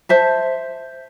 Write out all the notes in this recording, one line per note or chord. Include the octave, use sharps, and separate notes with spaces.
C5 E5 A5